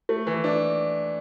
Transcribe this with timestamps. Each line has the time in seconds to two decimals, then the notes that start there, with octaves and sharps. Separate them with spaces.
0.09 A3
0.27 E3
0.44 D4